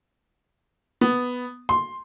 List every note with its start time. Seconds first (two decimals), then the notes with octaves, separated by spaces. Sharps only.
1.01 B3
1.69 C6